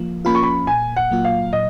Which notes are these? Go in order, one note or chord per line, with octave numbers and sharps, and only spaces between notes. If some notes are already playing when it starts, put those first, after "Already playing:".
Already playing: F3 A#3
A#3 C#4 F4 B5
C#6
B5
A#2 G#5
F#5
F#3 A#3 F4
F5
A#2 D#5